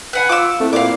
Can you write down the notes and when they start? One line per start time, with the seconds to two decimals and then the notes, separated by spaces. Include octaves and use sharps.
0.13 B4 F#5 G#5
0.29 F4 D6 E6
0.60 A3 C4 E4
0.73 A#2 D5 F5 D6